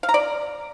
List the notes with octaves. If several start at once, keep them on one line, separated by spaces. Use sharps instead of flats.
F5
A#5
D5